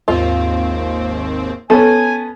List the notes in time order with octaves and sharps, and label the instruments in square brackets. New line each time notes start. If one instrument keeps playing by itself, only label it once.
[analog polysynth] G#1 D#2 C4 [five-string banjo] F4
[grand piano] B3 C#4 [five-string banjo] A4 [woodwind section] G#5